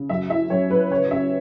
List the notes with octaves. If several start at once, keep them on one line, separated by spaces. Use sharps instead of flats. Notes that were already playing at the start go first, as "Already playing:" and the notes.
Already playing: C#3
F#2 E5
E4 E5
F#2 C#5
F#3 B4
C#3 C#5
C#4 E5